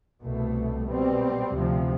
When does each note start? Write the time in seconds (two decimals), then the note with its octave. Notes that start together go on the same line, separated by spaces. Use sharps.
0.22 C2 B2 A3
0.89 B2 G3 C4
1.56 D2 C3 F3